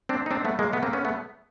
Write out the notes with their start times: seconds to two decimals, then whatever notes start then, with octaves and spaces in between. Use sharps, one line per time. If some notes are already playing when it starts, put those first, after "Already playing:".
0.09 C4 D4
0.26 D#4
0.31 C4 D4
0.45 A3 B3
0.59 G#3 A#3
0.73 A3 B3
0.83 A#3 C4
0.93 B3 C#4
1.05 A3 B3